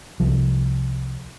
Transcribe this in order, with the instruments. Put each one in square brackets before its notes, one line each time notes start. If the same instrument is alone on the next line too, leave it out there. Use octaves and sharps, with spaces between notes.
[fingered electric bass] C2 F3